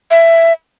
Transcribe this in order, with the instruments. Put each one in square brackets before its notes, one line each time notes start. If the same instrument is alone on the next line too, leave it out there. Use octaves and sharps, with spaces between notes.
[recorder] E5